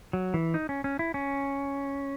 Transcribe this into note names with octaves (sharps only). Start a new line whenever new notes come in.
F#3
E3
D#4
C#4
C#4
E4
C#4